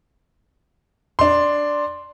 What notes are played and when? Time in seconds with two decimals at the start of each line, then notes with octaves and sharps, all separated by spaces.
1.19 D4 C6